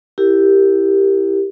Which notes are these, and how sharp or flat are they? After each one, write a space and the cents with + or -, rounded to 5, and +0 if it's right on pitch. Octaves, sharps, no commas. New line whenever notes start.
E4 +0 G4 +0 A#4 -20